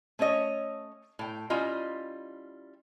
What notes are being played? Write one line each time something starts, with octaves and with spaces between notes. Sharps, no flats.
A3 C#4 C#5 D#5
A2 G5
G3 C#4 E4 F4 D#5